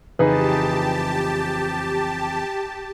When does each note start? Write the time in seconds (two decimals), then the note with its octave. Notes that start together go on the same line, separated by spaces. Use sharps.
0.19 F2 C#3 E3 D#4 G4 G#4 B4 A5